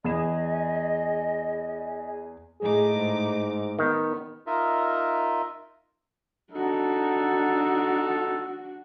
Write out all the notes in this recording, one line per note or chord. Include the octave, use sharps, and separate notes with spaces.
E2 G#4 D#5 B5 E7
A2 D#4 G#4 D6
G#2
D#3 B3
D#4 F4 A#4 D#5 E5
D4 D#4 F#4 A4